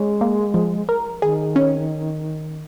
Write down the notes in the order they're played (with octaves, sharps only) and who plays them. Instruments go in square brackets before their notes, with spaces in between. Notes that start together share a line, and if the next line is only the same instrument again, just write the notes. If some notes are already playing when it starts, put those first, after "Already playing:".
Already playing: [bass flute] G#3 [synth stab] C#4
[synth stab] A#3
F3
A#4
[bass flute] D#3 [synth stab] G#4
[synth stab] C#4